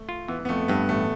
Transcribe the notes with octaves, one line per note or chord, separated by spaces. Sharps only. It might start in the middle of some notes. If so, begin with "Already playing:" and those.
Already playing: A3
F4
E3 B3
B3
F2 A3
G2 B3
A1 A3